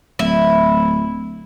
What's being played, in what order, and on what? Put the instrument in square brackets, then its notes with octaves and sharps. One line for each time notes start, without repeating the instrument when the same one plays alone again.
[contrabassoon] D1 [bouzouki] E4